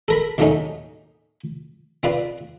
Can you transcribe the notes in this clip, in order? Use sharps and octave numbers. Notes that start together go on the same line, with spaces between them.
A4 A#4 B5
D#2 A2 F#3 A3 C#4 D#4
C4 F4 B4 D5